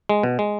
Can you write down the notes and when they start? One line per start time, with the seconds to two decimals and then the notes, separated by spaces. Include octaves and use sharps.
0.09 G#3
0.23 B2
0.39 G#3